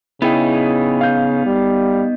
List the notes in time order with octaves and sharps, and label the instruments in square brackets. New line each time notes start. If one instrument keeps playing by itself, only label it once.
[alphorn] C#3 [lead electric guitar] B3 D#4 [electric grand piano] E4 G#4 G5
[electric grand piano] F5 G6
[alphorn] G3